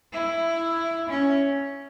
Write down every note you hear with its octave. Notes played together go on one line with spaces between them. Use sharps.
E4
C#4